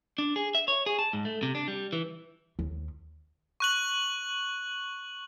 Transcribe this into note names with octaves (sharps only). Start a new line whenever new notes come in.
D4
G#4
E5
C#5
G#4
A5
G#2
A3
C3
D4
G3
E3
D#2
C#6 F#6 F#7